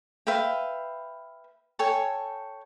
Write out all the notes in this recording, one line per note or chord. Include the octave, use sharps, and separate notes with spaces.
B4 E5 F5 G5
A4 C#5 G5 G#5